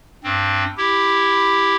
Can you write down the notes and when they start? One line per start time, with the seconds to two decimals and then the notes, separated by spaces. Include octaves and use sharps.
0.23 G2 C4
0.77 E4 G4